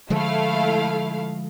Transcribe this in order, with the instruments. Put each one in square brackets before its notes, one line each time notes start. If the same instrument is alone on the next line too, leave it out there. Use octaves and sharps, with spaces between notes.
[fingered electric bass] D3 F3 G#3 [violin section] A3 E4 F5